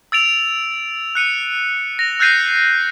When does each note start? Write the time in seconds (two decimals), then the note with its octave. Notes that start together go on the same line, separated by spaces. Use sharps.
0.12 E6 A6 D7 F7
1.15 F#6 C#7 D#7
1.99 A#6 F7
2.19 E6 F#6 G6 A6 C7 D#7